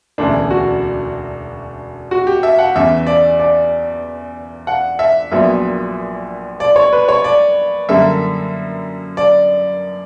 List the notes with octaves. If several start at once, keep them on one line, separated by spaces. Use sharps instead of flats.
E1 D2 C#3 E3 D4
F#4
F#4
G4
E5
F#5
E2 C#3 E3 E5
D5
D5
F#5
E5
A#1 A#2 F#3 B3 E5
D5
C#5
B4
C#5
D5
F#2 D3 G3 A#3 E5
D5